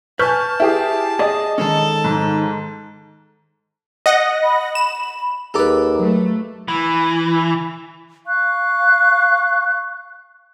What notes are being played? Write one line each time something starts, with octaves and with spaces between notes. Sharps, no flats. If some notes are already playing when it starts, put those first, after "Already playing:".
B4 G#5 A5 C#6 F6 G6
E4 G4 G#4
G#4 D5 D#5
D#3 G#3 C#4 A4
G#2
D#5 F#5 A#6
B5
E7
D#2 G#4 A4 B4 A#5 D6
F#3 A3
E3
F5 C#6 F#6